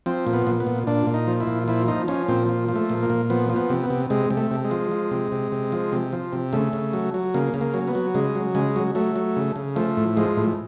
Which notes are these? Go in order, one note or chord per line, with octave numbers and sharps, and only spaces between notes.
F3 C4
A#2
B3
A#2
B3
A#2
A#2 D4
A#2
D#4
F3
E4
A#2
F3 E4
F3 D#4
F3 C#4
A#2 C4
F3
F3
A3
A#2
A#3
A#2
F3 B3
F3
B3
C3
B3
C3
C3 G#3
C3
A3
C3
G#3
F3
F3
C3
C3
C3
F3
C3
F3
C3
C#3 A3
C#3
F#3
F#3
C#3 A#3
C#3
A#3
F#3
B3
F#3
C#3 G#3
F#3
C#3 G#3
F#3
F#3 A3
F#3
C#3
C#3
F3 A3
A2
F3 G#3
A2